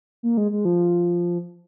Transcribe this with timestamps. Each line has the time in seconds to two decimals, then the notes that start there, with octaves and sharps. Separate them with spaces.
0.23 A#3
0.37 G#3
0.51 G#3
0.65 F3